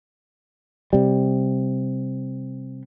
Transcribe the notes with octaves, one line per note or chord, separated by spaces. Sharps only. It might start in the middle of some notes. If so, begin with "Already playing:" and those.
C3 G3